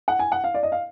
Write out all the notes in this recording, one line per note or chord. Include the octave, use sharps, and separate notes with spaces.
F#5
G#5
F#5
F5
D5
D#5
F5